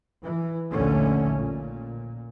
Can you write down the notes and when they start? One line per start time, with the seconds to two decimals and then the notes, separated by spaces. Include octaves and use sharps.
0.22 E3
0.71 A#1 D#2 D3 A3 C#4
1.38 A#2